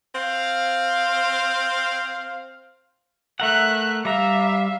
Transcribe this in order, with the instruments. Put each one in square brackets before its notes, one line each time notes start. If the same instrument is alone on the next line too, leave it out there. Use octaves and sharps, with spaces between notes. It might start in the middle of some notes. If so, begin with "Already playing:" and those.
[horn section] C4 F5
[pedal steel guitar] A3 A#4 F#5 [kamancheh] E5 F#6
[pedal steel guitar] G3 A#5 [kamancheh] E5 F5